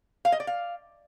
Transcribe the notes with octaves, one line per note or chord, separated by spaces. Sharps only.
F5
D#5
D5
F5